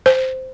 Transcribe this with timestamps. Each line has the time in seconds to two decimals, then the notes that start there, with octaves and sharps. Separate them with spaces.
0.06 C5